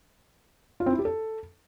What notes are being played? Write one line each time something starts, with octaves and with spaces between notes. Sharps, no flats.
F4
C4
E4
G4
A4